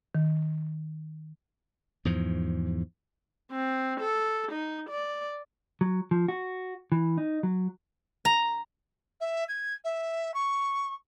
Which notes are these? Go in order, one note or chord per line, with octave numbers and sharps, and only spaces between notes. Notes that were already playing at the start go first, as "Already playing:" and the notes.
D#3
E2 G#2 F3
C4
A4
D#4
D5
F#3
F3
F#4
E3
D#4
F#3
A#5
E5
G#6
E5
C#6